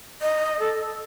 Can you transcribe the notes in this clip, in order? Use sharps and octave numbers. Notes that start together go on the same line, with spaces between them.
D#5
A4